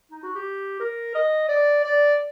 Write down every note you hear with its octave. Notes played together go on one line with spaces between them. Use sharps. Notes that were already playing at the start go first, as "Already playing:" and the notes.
D#4
F#4
G4
A#4
D#5
D5
D5